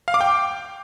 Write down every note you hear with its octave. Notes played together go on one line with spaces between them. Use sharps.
F5
D6
G5